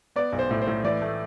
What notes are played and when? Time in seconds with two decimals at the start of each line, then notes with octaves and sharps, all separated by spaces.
0.16 B3 D5
0.33 B1
0.39 C5
0.51 A2
0.62 C5
0.67 A2
0.84 E3 D5
1.01 A3